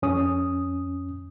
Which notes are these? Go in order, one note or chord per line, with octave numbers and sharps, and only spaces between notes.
F2 C#4 D#6